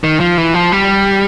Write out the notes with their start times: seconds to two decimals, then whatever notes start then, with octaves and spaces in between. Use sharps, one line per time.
0.04 D#3
0.20 F3
0.38 E3
0.54 F3
0.72 G3